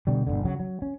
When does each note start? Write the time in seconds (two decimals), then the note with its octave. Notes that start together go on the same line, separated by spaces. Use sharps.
0.07 B2 D3 G3
0.27 G1 C#2 B2 D3
0.45 C#3 F#3
0.60 F#3
0.82 C#4